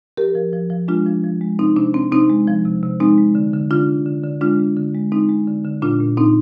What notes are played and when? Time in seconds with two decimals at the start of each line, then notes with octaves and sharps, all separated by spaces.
0.17 F3 G4 A#4
0.35 F3
0.53 F3
0.70 F3
0.88 G#3 D4 F4
1.06 F3
1.24 F3
1.41 G#3
1.59 C3 C4 D#4
1.76 C3 D4
1.94 C3 C4
2.12 C3 C4 D#4
2.30 G#3
2.48 F3
2.65 C3
2.83 C3
3.00 G#3 C4 D#4
3.18 G#3
3.35 D3
3.53 D3
3.71 D3 D4 F4
3.89 D3
4.06 D3
4.24 D3
4.41 G#3 D4 F4
4.60 G#3
4.77 D3
4.94 G#3
5.12 G#3 C4 D#4
5.29 G#3
5.47 D3
5.65 D3
5.82 A#2 D4 F4
6.00 A#2
6.17 A#2 C4 D#4